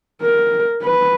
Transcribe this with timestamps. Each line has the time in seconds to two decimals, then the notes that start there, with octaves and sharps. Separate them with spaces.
0.22 A#4
0.83 B4